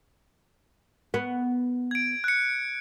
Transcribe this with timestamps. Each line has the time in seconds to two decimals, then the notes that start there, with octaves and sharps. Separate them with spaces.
1.14 B3
1.91 G#6 D7
2.24 F#6 C#7